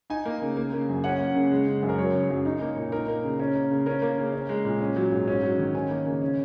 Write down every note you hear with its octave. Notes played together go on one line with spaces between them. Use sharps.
D#4 G#5
A#3
C#3
A#3
C#3
F#2
C#4 F#5
A#3
C#3
G#3
C#3
F#2
A#4
F#3 C#5
C#3
F#2
D#4
A#3
A#2
D#4 A#4
A#3
C#3
C#4
A#3
C#3
C#4 A#4
A#3
C#3
C#4
G#3
A#2
C#4
F#3
G#2
C#4
F#3
D#3
C#4 G#5
A#3
C#3
C#4